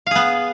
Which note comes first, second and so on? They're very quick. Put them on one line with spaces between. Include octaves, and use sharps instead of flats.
F5 G#4 B3